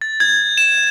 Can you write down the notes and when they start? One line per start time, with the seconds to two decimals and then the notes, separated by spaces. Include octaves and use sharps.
0.01 A6
0.20 G#6
0.58 E7